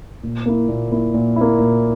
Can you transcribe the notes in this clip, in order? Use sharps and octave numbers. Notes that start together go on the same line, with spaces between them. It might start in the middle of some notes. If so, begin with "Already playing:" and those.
A#2
A#3 E4
A#2
A#3 E4
A#2
A#3 E4
A#2